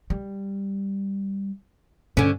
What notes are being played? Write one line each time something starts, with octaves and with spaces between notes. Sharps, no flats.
G3
G2 D3 C#4